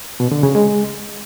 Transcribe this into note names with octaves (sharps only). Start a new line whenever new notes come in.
B2
D3
C#3
G#3